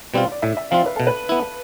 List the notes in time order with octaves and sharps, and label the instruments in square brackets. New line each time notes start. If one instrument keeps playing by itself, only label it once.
[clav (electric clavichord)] B2 G3 C4 F4
[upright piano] D5
[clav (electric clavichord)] A2 [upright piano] E5
[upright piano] E5
[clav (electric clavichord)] F3 C4 F4 [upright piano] F5
[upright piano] B4
[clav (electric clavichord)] B2 [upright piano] A4
[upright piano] B4
[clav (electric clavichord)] B3 E4